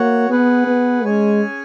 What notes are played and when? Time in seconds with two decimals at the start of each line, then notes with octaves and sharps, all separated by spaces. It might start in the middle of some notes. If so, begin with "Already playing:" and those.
Already playing: A#3 F#4 C#5 F#5
0.29 B3 G#4 B4 F#5
0.67 B3
1.04 G#3 C#4 G#4 C#5 G#5